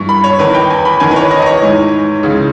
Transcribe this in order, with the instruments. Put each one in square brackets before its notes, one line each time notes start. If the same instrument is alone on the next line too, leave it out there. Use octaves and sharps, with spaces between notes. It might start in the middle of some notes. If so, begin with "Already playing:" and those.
Already playing: [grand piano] G2 E3 C#6
B5
C#5
E2 D#3 B4
G5
G#5
B5
E2 D#3 G#5
B4
C#5
D#5
D#5
C#5
G#2 E3
C#2 C#3 E3